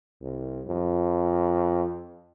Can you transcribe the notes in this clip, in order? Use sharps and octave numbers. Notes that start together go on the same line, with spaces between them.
C2
F2